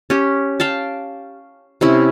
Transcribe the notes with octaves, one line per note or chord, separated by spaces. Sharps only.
C#4 G4
F5 G5 A5
C3 C#4 E4